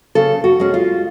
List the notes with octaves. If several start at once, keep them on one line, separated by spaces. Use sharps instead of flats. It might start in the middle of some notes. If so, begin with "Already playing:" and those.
C#3 A4
F#4
G#3 C#4
F4